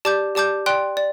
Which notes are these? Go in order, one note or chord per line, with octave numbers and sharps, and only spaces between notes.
G4 D5 A5 D6 G6
G4 D5 A5 D6 G6
D5 G5 C6 F#6
D5